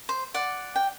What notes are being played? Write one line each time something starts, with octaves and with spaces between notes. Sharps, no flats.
C5
D5 F#5
G5